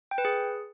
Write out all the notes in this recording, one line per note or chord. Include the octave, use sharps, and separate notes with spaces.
G5
B4
G#4